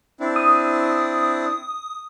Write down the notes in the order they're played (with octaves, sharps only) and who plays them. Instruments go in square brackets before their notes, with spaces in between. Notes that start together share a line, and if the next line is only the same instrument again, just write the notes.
[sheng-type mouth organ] C4 D4 E4
[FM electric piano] D#6